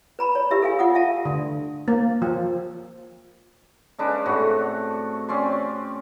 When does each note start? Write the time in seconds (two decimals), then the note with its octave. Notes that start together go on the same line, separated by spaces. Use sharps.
0.19 B4 A#5 B5
0.35 C#5
0.51 E4 G4 E5 E6
0.62 A4 F5 G#5
0.79 F4 F#5 D#6
0.95 E5 F5 A5
1.25 D3
1.88 A#3
2.22 F3
3.98 C#3 G#3 D4 B4
4.26 A2 C3 F#4
5.29 C4 C#4 D5 C6